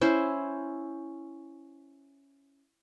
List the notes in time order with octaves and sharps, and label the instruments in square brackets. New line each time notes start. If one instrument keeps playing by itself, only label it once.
[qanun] C#4 E4 C5